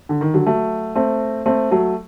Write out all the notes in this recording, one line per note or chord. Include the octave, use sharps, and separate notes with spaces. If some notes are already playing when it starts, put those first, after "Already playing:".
D3
D#3
D3 F#3
F#3 A3
A3 C4
A3 C4
F#3 A3